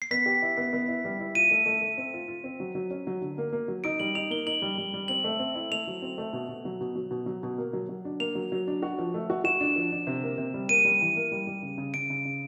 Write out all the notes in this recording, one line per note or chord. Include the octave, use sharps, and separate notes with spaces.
C7
B3 B6
G4
E4
B3
B3
E4
G3
E4
F4 D#7
A3
A3
A3
C4
F4
F4
C4
F#3
F#3
C#4
F#3
D3
A#3
A#3
F#3
D#4 D7
G3 F#7
D#4 F7
A#3 G7
D#4 F#7
G3
G3
G3
C4 F#7
A3
C4
E4
A3 F7
F#3
C4
A3
B2
B2
F#3
B2
F#3
B2
F#3
B2
A#3
F#3
F#3
D4
A#3 F7
F#3
F#3
D4
F#4
F3
A3
F#4
F#4 E7
D4
F3
D4
C3
A#3
C3
G3
A#3 D#7
G3
E3
A#3
G3
G3
C#3
C#3
C#3 D7
C#3
C#3